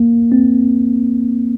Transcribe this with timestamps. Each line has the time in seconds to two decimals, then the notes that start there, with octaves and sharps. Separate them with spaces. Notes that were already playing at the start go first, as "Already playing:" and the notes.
Already playing: A#3
0.32 C4